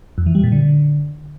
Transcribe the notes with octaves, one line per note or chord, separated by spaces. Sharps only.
F2
E3
G3
A#2
D3